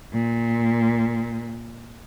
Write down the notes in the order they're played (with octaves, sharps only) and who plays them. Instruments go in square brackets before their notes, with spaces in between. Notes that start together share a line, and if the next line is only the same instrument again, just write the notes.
[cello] A#2